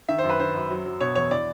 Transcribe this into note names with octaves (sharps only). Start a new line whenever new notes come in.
D#3 E5
C5
F#2
B4
D#3 C5
F#2
F#3
F#3
B2 C#5
E2 C#5
E3 D5